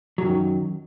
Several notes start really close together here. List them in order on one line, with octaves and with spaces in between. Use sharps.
F#3 F#2 D#3